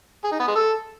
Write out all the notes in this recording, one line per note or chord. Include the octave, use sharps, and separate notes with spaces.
G#4
D#4
B3
G#3
A4